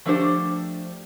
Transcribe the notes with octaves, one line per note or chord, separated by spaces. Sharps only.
F3 A3 D4 G4 C5